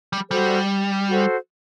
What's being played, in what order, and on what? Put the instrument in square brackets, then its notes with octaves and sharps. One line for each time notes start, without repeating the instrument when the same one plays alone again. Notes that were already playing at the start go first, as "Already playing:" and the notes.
[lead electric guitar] G3
[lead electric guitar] G3 [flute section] F#4 A4 C5
[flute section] F#4 A4 C5